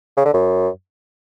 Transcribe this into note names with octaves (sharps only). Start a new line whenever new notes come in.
C#3
D3
F#2